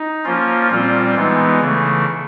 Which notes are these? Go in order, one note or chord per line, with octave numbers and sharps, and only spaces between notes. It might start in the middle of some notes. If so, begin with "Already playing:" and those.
Already playing: D#4
F3 A#3 C#4 F4
A#2 G3 C4 F4
E3 G#3 B3 D#4
C#3 E3 A3